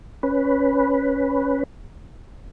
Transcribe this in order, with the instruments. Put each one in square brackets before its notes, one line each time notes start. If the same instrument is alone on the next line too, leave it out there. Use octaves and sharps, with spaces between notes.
[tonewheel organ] C#4 B4